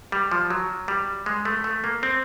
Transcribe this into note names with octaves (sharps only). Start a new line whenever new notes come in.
G3
F3
F#3
G3
G#3
A3
A3
A#3
C4